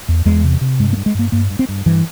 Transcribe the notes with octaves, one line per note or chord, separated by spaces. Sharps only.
E2
E2 G#3
C3
C3
G2 G#3
A#3
G2
G#3
G2 A#3
G2 A#3
G2
C4
G2
G2 E3